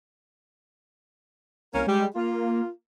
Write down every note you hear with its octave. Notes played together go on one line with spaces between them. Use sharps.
C2 A#3 C#4 A#4
G3 G#3
A#3 F4